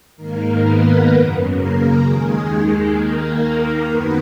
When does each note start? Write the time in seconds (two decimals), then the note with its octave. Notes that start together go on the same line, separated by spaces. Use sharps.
0.16 G#2 D#3 A#3 A#4
0.63 B3 B4
1.09 F#2 C#3
1.56 A#3 A#4
2.02 D#2 D#3 G#3 G#4
2.96 D#2 D#3 A#3 A#4
3.89 F#2 D#3 B3 B4